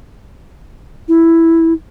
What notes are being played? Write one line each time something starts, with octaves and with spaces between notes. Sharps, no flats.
E4